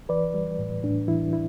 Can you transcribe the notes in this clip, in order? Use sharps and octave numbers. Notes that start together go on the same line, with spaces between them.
E3 B4 D5
G3
A2
A2 D4
E3 E4
E4